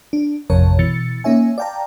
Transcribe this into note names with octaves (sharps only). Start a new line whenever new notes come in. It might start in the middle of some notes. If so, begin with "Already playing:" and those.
D4
A1 F2 C3 A#4 C#5 A5
B2 E3 A6 C#7
A#3 C#4 D#4 C#5 E5 G#5
D5 F5 G5 A5 A#5